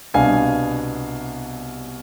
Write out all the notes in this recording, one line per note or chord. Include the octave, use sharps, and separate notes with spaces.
C2 B2 B3 D4 F5 G#5